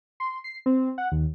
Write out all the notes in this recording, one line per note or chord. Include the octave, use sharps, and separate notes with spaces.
C6
C7
C4
F#5
D#2